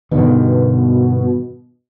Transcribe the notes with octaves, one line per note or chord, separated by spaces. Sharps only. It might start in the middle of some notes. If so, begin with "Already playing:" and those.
G2 B2 D3 D#3